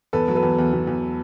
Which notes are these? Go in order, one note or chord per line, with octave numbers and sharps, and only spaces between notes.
E2 A4 B4
F#3
A4 B4
E2
E2
E2
E2